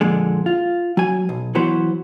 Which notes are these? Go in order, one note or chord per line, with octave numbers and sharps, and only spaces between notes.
F2 A#2 D3 G#3
F4
F#3 G#5
B1
E3 F#3 B3 C5